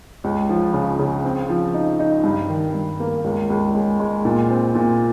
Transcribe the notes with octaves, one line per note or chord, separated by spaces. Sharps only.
C#2
F3
C#3
C#3
C4
F3
D#4
D#4
G2
D#3
G2
A#3
C#2
C#2
G#3
G#3
A#2
C4
A#2